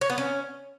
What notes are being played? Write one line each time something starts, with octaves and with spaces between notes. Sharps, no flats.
C#5
B3
C#4